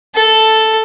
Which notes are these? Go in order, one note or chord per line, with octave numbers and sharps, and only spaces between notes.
A4